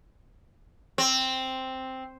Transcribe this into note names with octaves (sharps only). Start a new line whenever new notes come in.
C4